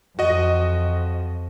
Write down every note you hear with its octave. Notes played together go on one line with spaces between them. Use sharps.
F2 F#4 D#5